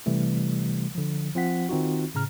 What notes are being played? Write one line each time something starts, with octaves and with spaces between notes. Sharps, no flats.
C3 E3 G3 A3
D3 F3
F3 C4 F4 F#5 B6
D#3 C4 D#4 F4 F#4
A2 C#3 A#5 F6